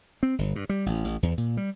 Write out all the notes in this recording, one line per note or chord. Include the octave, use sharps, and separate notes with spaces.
C4
G1
G2
G3
A1
A1
E2
A#2
G3